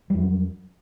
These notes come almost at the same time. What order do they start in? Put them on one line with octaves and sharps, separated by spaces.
G3 F2 F#3